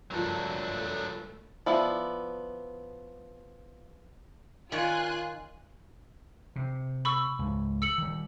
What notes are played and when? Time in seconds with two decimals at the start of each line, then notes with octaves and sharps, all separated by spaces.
0.11 F#1 G2 F3 F#3 A3 D4
1.66 F3 B3 E4 D5
4.72 D#3 F4 C#5 D5 G#5 F#6
6.56 C3
7.05 B5 C#6 E6
7.39 C#2 G#2
7.82 E6 C#7 F#7
7.98 D#3 G3